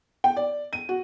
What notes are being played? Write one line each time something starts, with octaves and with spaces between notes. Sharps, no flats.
G5
D5
D#7
F#4